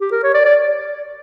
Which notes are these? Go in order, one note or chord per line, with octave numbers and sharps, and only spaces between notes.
G4
A#4
C#5
D5
D5